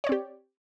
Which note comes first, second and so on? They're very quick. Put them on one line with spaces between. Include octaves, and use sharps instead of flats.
C#5 D5 C4 G4